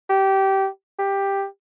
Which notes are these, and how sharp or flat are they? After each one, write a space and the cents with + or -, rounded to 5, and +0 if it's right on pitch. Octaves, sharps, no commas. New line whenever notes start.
G4 -20
G4 +10